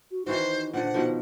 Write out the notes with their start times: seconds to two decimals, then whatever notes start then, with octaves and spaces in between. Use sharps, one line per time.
0.11 F#4
0.26 D#3 E3 D#4 F#4 C5
0.74 A#2 D3 C5 F#5
0.94 B2 D#3 F3